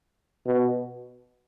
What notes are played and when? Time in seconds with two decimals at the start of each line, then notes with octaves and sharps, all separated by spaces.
0.47 B2